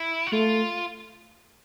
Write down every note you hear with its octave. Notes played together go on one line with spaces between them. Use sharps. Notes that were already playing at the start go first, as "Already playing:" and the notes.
Already playing: E4
F#4
A3 F4